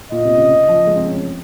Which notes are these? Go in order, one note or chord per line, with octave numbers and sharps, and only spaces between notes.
A#2 D#5
C3
C#3
F3
G#3
C4
C#4
C4